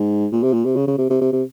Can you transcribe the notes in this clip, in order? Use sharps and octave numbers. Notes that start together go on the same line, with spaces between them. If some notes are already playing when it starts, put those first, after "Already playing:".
Already playing: G#2
A#2
C3
A#2
C3
C#3
C#3
C3
C3
C3
C3